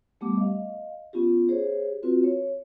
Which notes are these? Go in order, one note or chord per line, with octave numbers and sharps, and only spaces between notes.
G3 A3 B3 G4 F#5 D6
D#5 F5
B3 C#4 F4 G4
G4 G#4 C5 C#5
C4 F4 F#4 B4
C#5